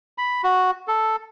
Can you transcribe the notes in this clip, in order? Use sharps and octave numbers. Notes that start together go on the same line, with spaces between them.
B5
F#4
A4